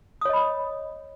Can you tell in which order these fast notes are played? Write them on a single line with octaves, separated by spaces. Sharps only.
D#6 C#5 D#5 B5